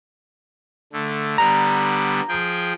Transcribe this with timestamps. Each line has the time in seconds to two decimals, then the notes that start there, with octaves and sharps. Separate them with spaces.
0.93 D3 A3
1.38 D3 G3 B3 A#5
2.28 F3 G#4 G5